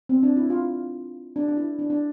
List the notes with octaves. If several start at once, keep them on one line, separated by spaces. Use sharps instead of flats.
C4
D4
E4
F4
D4
D4
E4
D4
D4